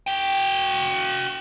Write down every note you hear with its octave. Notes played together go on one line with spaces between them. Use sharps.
F#4 G5